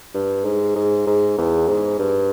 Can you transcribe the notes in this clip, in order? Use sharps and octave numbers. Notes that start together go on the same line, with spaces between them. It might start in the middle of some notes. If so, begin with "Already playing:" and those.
G2
G#2
G#2
G#2
E2
G#2
G2